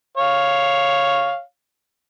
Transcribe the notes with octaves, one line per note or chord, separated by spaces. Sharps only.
C#5 F5